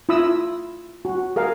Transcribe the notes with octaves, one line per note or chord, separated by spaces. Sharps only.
E4 F4 B5 D#6 E6
F#4
G#4 A#4 F5